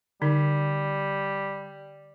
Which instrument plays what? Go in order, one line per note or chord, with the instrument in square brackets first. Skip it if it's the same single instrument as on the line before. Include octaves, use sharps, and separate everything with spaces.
[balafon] D3 D#4 [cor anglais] G3